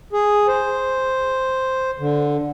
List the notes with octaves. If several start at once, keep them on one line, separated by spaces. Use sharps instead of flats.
G#4
C5
D3